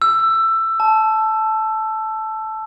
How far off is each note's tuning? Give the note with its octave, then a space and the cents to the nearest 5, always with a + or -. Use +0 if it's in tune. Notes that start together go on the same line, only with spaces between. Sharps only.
E6 +15
A5 -10